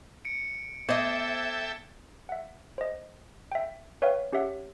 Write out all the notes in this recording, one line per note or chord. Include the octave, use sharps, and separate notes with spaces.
C#7 D7
B3 A4 C5 D#5 E5 G5 G#6
E5 F#5
C5 D#5
E5 G5
B4 C#5 E5 F5 G5
C#4 G4 C#5 E5 F#5